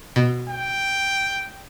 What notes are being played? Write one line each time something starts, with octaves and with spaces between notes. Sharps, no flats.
B2
G5